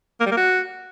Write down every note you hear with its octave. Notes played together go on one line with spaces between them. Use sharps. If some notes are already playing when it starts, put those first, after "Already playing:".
A#3
G3
A#3
F#4